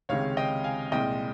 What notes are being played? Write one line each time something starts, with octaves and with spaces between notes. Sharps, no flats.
C#2 C3 D#3 G#3 C#5 F5
D#5 G5
F5 G#5
C2 A#2 G#3 D#5 G5